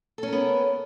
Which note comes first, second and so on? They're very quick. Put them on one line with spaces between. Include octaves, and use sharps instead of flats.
A4 C#4 A#4 B3